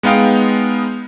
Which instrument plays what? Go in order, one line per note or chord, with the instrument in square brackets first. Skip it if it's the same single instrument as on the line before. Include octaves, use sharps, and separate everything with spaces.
[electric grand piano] G#3 B3 D#4 F5 G5